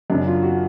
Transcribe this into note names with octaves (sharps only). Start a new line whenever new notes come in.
F#2 C#3 D4
F4
F#4